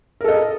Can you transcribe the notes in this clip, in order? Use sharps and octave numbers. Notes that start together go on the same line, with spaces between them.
A4 A#4 D#5